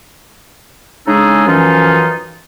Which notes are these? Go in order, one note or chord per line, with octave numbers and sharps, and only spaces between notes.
C#3 G#3 D4 D#4 G#4 A4
F#2 E3 F3 C#4 D#4 F4